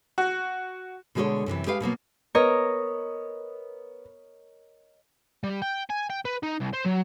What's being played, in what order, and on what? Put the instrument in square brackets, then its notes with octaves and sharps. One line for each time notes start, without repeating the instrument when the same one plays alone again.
[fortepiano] F#4
[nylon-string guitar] B2 D3 G#3 G#4 A4 C#5
F#2 C3 D#3 E3
G#3 G4 B4 F5
B2 F#3 A#3 B3
[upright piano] B3 [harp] A#4 C#5 D#5
[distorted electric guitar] G3
G5
G#5
G5
B4
D#4
C2
C5
F#3